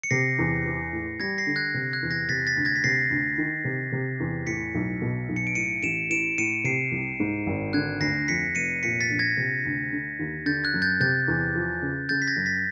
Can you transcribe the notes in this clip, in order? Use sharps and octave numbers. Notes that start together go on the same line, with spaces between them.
C#7
C3 A#6 C7
E2
E3
A2
G3 G#6 A#6
A#6 C7
D3
F#6 G#6
C3
F#6 G#6
E2
G#6 A#6
C3 A6 B6
A6 B6
D2
G#6 A#6
B6
C3 A#6 C7
D2
D#3
C3
C3
E2
A2 B6 C#7
B1
B2
B1
C#7
D7
A2 C#7 D#7
A1 D7 E7
E3 D7 E7
A2 C#7 D#7
C3 C7 D7
C2
G#2
G#1
D3 F#6 G#6
D2 A#6 C7
F2 B6 C#7
F1 C#7 D#7
A#2 B6 C#7
A6 B6
A#1
G#6 A#6
C3
D2
D3
D#2
D3 G6 A6
F#6 G#6
F#2
G6 A6
C3 G6 A6
E2
F3
C#3
C#3 G6 A6
B6
G#6 A#6
F#2
A6 B6